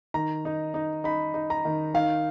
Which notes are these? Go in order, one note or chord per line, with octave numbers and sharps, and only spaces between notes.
D#3 A#5
D#4
D#4
D#4 B5
D#4
A#5
D#3
D#3 F5